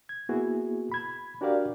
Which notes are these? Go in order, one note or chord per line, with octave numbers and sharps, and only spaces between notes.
G#6
A#3 B3 E4 F#4 G#4
B5 G#6
D4 F#4 G4 A#4 D5 F5